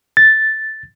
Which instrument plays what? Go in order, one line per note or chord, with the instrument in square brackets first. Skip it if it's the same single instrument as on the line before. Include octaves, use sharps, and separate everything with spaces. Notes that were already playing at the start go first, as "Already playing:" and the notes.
[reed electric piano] A6